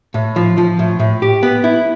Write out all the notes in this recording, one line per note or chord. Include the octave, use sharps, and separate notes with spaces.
A2
F3
F3
A2
A2
G4
B3
E4